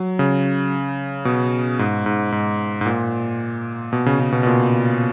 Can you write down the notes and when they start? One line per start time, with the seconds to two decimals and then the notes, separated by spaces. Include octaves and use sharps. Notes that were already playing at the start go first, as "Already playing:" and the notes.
Already playing: F#3
0.19 C#3
1.25 B2
1.79 G#2
2.06 G#2
2.32 G#2
2.81 G#2
2.86 A#2
3.93 B2
4.06 C#3
4.20 C#3
4.32 B2
4.43 B2
4.46 A#2